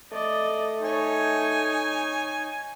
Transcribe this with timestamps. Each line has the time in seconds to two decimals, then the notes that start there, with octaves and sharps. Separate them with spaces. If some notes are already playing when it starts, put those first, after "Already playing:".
0.12 A3 D5 D#5
0.82 D#4 C#5 G#5